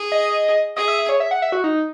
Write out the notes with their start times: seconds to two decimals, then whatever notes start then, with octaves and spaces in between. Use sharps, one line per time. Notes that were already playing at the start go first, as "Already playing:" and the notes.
Already playing: G#4
0.12 D#5
0.76 G#4 D#5
0.88 E5
0.99 E5
1.09 C#5
1.20 E5
1.31 F#5
1.42 E5
1.52 F#4
1.64 D#4